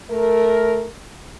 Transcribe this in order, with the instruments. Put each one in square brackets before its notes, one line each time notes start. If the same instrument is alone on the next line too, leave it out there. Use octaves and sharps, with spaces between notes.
[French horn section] A3 A#4